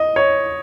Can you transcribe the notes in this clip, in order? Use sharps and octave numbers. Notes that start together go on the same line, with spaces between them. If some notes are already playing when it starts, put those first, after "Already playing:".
Already playing: D#5
C#5